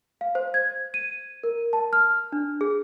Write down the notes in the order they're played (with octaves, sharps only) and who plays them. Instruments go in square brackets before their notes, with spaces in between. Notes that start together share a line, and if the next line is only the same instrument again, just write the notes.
[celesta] F5
C5
G#6
D#7
A#4
A5
F6
D4
G#4